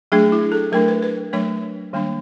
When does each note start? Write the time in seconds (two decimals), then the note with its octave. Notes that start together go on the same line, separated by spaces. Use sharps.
0.12 F#3 A3 D4 G#4
0.32 E4
0.52 A4
0.72 F#3 A3 D4 A#4
0.88 B4
1.02 B4
1.33 F#3 A3 D4 C#5
1.93 D#3 G3 A#3 D4